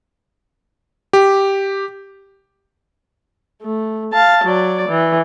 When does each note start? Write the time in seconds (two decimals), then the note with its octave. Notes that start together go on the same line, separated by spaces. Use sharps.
1.13 G4
3.62 A3
4.13 F5 A5
4.44 F#3 D5
4.88 E3